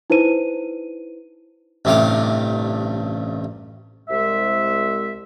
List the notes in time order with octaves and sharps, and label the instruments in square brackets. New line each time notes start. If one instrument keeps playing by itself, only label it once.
[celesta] D#4 E4 B4 C5 D#7
[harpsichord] A1 G2 C3 A3 F5 D6
[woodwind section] C2 G#3 E5